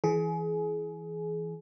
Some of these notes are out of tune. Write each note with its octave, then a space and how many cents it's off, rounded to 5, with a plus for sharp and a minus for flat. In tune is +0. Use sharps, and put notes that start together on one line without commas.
E3 +0 G#4 +25